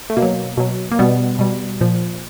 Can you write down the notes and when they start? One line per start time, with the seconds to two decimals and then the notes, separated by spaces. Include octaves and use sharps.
0.10 A3
0.17 B2 A#3
0.22 F#3
0.57 B2 F#3
0.92 A#3
0.99 B2 G3 B3
1.39 B2 G3
1.81 A#2 F3